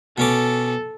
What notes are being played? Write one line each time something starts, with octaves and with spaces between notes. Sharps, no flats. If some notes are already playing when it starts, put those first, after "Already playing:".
B2 C#4 A4 D6